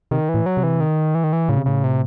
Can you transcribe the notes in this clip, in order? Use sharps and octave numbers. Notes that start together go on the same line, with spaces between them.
C3 D#3
E3
A2
F#3
C3
E3
D#3
E3
D#3
E3
A2 C#3
C3
A2 C#3
C3